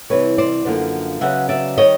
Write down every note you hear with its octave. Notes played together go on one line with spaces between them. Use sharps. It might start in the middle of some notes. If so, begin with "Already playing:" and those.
C3 E3 G3 B4 C#5
C5 D5
F#2 D3 F3 A#3
C#3 F#3 B3 E5 F#5
D5 E5
D#3 G3 C#5 D#5